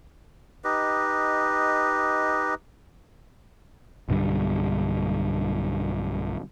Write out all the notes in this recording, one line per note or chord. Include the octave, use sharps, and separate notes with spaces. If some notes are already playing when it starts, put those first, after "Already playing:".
D#4 G4 B4 D#5
B1 G2 D3 G3